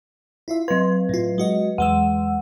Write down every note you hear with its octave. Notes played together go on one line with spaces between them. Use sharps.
E4 F4 E5
F#3 B4 C6
A2 F4
G#3 F#4 D#5
E2 G#3 F#5 E6